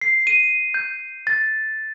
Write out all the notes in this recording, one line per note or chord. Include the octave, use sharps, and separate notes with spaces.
C7
D#7
G6
A6